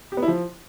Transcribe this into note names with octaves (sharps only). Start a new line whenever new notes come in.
G4
B3
E4
F3